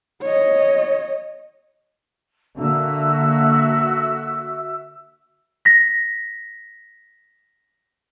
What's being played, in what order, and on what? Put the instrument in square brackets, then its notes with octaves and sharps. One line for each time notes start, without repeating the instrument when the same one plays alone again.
[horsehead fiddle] C#5 D#5
[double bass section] D3 A#3 [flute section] F#4 E5 E6
[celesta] A#6 B6